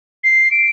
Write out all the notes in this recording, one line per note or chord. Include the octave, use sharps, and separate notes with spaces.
C7
D7